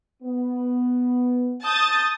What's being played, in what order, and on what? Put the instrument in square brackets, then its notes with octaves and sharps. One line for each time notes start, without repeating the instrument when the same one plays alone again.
[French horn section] B3
[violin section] A5 G6 A6 [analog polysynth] D#6